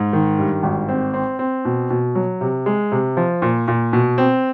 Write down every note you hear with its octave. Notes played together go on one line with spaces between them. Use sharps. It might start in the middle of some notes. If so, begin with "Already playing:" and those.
Already playing: G#2
D#3
G2
G#1
C4
C4
C4
B2
B2
F#3
C3
G#3
C3
F3
A#2
A#2
B2
C4